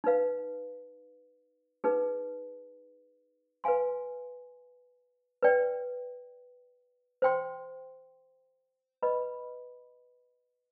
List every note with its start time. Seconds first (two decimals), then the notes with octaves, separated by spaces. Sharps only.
0.04 D#4 B4 F5
1.84 D#4 G#4 B4
3.64 B4 F5 G#5 C6
5.43 B4 D5 G5
7.22 C5 G5 C6
9.02 B4 D#5 B5